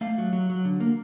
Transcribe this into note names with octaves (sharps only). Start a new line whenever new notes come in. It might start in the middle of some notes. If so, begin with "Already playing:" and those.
A3 F5
F#3
F#3
F#3
D3
A#3